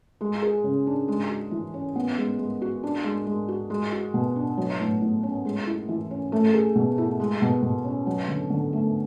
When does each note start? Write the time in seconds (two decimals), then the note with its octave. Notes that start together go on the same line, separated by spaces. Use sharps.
0.21 G#3
0.42 G#4
0.64 C#3
0.87 D4
1.08 G#3
1.30 F#4
1.51 E3
1.74 C#4
1.96 B3
2.18 G#3
2.39 G#3
2.62 F#4
2.83 D4
3.04 G#3
3.26 G#3
3.48 F#4
3.70 G#3
3.92 F#4
4.14 B2
4.36 D4
4.57 F#3
4.80 A2
5.01 A2
5.23 C#4
5.45 G#3
5.66 E4
5.88 E3
6.11 C#4
6.32 A3
6.54 G#4
6.76 B2
6.98 E4
7.20 G#3
7.42 B2
7.63 B2
7.84 C#4
8.07 F#3
8.28 D3
8.50 D3
8.73 A3